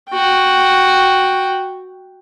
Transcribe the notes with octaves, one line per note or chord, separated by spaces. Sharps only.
F#4 G5